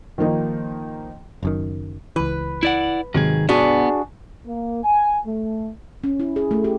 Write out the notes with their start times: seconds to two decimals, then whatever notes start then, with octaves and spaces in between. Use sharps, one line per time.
0.18 D#3 F3 A#3 D#4
1.43 F#1 F#2 D#3
2.16 C#2 E3 B4
2.63 E4 D5 F#5
3.14 G#2 C3 D#3 F#3 G#4
3.49 B3 D4 F#4 G#4
4.46 A#3
4.84 G#5
5.26 A3
6.04 C#4
6.20 E4
6.36 G#4
6.51 A3
6.64 G4